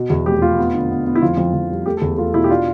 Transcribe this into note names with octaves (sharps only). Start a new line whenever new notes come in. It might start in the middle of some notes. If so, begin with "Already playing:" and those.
Already playing: B2
E2
F1 G4
F1 F4
B3
D3
B3
B3
E4
F2 F4
F2
F2
G3
A3 G4
A4
E2
A3 F4
B2 E4
G4
D4 F4